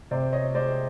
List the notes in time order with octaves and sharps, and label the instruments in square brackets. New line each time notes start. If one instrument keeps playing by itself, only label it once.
[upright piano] C3 C5 D5
C#5 D#5
G#3 C5 D5